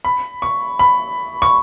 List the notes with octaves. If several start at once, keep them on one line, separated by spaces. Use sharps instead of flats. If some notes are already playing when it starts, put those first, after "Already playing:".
B5
C#6
B5
C#6